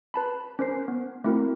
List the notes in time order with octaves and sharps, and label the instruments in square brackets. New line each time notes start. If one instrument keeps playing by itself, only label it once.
[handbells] B4 A5 B5
C#4 A#4 C5 C7
B3
A3 C4 E4 F#4 A#4